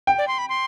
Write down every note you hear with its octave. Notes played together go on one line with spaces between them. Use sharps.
G5
D5
C6
B5
C6